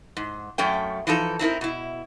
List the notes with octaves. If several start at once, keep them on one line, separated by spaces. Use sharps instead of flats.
G#2
F#2 A3 C#4 G5
E3 F3 D#4 A4
C4 D#4 E4 A#4
B2 E4